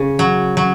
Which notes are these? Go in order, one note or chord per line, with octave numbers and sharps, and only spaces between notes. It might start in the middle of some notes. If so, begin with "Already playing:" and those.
Already playing: C#3
F#3
F#3